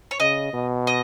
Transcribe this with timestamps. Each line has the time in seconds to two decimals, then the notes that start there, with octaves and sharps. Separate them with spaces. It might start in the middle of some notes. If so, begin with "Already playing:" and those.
0.11 C#5
0.20 C#3 D#5
0.53 B2
0.87 D#5